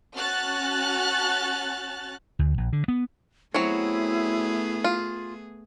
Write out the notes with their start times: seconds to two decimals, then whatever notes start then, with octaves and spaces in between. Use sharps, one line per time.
0.16 C#4 F#4 A5 F6 F#6 A6
2.39 D2
2.58 A#1
2.73 D3
2.88 B3
3.54 F#3 A3 B3 C4 E4 G#4 C#5
4.84 F4